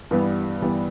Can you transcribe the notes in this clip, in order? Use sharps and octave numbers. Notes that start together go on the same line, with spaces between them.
G2 E3 G3 B3
G2 E3 G3 B3